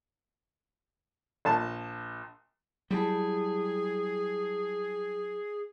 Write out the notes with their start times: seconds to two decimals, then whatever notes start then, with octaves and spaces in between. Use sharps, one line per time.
1.45 A#1 A5
2.91 F#3 G3 E4 G#4 A5